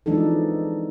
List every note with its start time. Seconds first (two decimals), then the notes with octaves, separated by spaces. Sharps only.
0.06 E3 F3 G#3 D4 D#4 A4